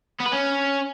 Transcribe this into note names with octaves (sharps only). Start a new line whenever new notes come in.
B3
B4
C#4